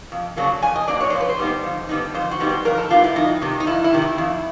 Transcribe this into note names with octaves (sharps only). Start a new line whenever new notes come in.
F2
C#3 F#3 A#3 D4
F2 G#5
D#5
C#3 F#3 A#3 D4 D5
C#5
F2 C5
B4
C5
D3 G3 B3 D#4
F2
D3 G3 B3 D#4
F2 C5
F#4
D3 G3 B3 D#4
C5
F2 A#4
A4
D3 G3 B3 D#4 F4
E4
F2 D#4
C3 D#3
D#4
F2 E4
E4
C3 D#3
E4
F2